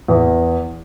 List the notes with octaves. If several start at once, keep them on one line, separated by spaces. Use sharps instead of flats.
E2